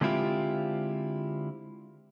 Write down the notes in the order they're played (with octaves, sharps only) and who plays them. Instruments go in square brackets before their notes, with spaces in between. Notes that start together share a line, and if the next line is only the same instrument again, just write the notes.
[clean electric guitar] D3 G#3 C4 E4 F4 G4